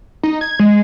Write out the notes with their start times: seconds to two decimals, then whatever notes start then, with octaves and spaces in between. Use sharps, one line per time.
0.23 D#4
0.41 G#6
0.59 G#3